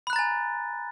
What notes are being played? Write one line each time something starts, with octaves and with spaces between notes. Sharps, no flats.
G#5 A#5 B5 F#6 A6